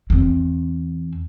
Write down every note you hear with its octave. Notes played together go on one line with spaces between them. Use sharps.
E2 C4